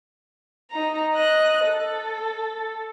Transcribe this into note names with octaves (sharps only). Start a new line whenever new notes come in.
D#4 A#5
D#5 F#6
A4